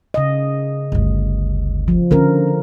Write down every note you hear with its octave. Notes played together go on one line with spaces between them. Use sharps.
C#3 D#5
G1 D2
F3
D3 C#4 D4 A#4